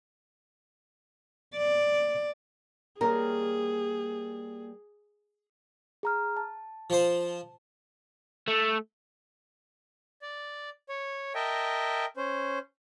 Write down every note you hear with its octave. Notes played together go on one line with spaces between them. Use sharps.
D5
G3 A#3 G#4 A#4 C#5
G#4 A#5 F6
A5
F3 C5
A3
D5
C#5
A#4 D#5 E5 G5 A5
C#4 C5